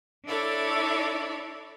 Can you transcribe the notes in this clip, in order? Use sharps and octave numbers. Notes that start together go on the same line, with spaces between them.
D4 E4 A4 C#5 D5